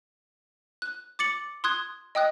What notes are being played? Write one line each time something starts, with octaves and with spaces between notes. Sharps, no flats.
F#6
D6 A6 C#7 F#7
C6 D#6 F#6 G#6
D#5 G5 D#6 F#6